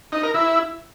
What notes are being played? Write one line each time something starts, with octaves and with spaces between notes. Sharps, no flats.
D#4
A#4
E4